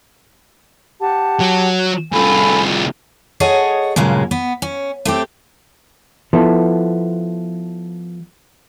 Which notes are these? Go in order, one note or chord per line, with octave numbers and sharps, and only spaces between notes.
G4 F#5 A5
F#3
C2 F4 A4 G#5 B5
G#4 A4 C#5 D#5 F#5
G2 A#2 C#3 F#3 G#3
B3
C#4
A3 C4 G4
F3 B3 E4 A4